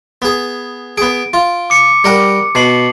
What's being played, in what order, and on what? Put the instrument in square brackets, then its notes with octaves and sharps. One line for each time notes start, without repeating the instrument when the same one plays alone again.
[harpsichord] B3 G#4
[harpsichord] B3 G#4 [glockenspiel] D7
[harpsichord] F4
[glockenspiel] D6 C#7
[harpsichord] G3 A#4 F#5
[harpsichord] B2 [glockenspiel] A5 C7 F#7